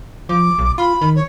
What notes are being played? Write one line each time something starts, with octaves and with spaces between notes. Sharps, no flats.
F3 D6
B1
F4 B5
D#3
C#5